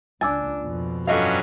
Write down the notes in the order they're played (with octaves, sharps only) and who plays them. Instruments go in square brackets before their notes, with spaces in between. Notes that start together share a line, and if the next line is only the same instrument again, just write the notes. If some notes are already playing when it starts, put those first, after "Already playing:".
[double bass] C#2 D4 [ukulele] G#5 [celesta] D6 E6 A6
[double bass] F2 B2
[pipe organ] G2 F#3 C#4 [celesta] F4 A4 [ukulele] D#5 F5